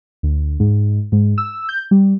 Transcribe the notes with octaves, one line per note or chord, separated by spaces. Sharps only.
D2
G#2
G#2
E6
G6
G3